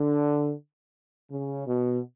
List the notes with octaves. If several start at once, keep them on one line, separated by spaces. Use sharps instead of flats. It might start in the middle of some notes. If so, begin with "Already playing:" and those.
Already playing: D3
C#3
B2